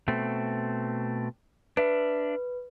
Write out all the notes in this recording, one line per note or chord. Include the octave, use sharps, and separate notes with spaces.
B2 A3 C4
D4 B4 E5